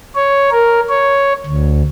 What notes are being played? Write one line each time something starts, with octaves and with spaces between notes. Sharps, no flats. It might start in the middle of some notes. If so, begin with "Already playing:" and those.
C#5
A#4
C#5
D2